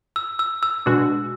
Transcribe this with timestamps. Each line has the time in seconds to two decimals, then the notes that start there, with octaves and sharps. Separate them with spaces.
0.16 E6
0.39 E6
0.63 E6
0.86 B2 G#3 D4 F#4